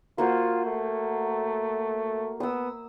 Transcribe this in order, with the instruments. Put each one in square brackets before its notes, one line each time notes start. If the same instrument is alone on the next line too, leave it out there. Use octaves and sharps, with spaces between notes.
[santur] A#3 F#4 C5 [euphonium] F4
[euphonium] A3
[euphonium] B3 [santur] D#6 E6